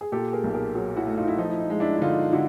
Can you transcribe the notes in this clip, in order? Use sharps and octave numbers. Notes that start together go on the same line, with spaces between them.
G#4
A#2 G4 A4
G#4 A#4
B1
G#4 A#4
F#3 F#4 G#4
E4 F#4
A3
D#4 F4
E4
F3 D#4
E4
D#4
G#3
D4 E4
E4
D3 D#4 F4
D3 E4 F#4